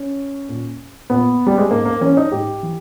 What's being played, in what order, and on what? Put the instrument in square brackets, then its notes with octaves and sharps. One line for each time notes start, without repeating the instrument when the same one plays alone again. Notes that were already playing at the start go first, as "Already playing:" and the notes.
Already playing: [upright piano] C#4
A#2
A#2 B3
G3
G#3
G#2 A#3
A#3
E3 C#4
D#4
G#2 G4
E3